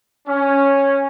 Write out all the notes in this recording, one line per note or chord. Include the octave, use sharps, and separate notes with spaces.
C#4